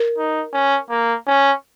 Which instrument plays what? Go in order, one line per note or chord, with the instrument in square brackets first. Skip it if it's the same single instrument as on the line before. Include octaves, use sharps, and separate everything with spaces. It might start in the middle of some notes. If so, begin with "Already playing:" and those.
Already playing: [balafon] A#4
[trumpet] D#4
C#4
A#3
C#4